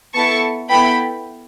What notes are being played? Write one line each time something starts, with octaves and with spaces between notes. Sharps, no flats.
B3 E4 A4 A5 C#6
B3 E4 A4 G5 B5